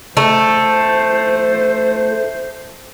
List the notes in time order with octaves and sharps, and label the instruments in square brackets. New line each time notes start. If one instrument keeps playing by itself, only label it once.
[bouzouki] A3 [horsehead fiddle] C5